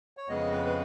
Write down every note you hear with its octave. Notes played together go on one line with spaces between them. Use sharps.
C#5
F2 C#3 G#3 B3 D#5
B4
B4